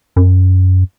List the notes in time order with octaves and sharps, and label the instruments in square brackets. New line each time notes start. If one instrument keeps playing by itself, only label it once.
[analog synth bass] F#2